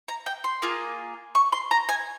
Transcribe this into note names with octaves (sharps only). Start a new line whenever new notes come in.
A#5
G5
C6
A#3 F4 G#4
C#6
C6
A#5
G#5